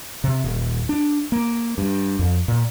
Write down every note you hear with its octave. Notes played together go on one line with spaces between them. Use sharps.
C3
D#1
D4
A#3
G2
F2
A#2